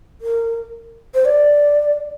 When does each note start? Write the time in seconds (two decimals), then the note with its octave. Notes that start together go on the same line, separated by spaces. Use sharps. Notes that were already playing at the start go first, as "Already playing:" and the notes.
0.21 A#4
1.14 C5
1.25 D5